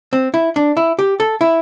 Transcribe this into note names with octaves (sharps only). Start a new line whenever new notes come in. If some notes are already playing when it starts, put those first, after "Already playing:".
C4
E4
D4
E4
G4
A4
E4